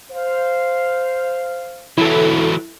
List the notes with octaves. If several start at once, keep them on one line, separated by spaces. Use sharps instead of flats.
C5 F5
E3 F#3 E4 A4